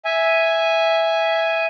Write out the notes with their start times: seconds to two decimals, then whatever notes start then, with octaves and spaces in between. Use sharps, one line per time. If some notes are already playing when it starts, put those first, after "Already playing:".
0.05 E5 G#5